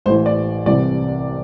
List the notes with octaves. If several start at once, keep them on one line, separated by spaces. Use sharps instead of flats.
A1 A2 E3 C5
D5
C2 C3 E3 D5